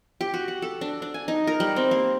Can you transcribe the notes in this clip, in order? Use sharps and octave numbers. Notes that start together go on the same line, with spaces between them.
G4
F#4
F#5
A4
D4
D4
G#5
D#4
A#4
G3
C4
A#3